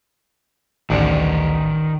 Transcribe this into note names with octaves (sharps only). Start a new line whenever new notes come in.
A1 D2 D#3 D5